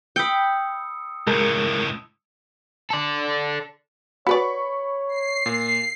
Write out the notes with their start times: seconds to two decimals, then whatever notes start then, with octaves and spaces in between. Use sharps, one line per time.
0.16 G5 B5 D#6 E6 C#7
1.27 C#2 A2 G#3 A#4 A5
2.90 A4 D5
4.27 F#4 B4 C#5 D5 B5 C#6
5.09 C7
5.46 A#2